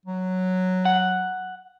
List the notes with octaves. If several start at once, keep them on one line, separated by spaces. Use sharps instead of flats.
F#3
F#5